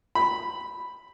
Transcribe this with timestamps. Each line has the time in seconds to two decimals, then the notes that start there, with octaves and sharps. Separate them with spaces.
0.15 B5